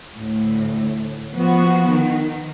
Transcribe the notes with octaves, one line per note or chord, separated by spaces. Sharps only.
D2 A2
F3 B3 F#4
D#3